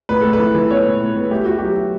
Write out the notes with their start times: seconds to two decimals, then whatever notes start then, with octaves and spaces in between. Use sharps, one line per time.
0.09 A2 B4
0.21 A2 A4
0.33 B4
0.40 E3
0.55 E3
0.71 B3 C#5
0.86 A2
1.01 A2
1.16 B3
1.31 A3 G4
1.45 E4 F#4
1.59 F#3 G4
1.77 E4